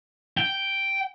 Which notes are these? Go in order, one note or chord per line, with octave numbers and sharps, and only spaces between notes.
G5